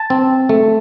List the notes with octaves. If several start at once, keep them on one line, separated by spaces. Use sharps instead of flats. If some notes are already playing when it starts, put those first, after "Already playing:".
Already playing: A5
C4
A3